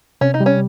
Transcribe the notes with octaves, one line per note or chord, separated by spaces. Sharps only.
C3 C#4
D#4
G3
C#4